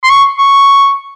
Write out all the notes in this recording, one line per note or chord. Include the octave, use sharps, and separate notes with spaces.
C6
C#6
C#6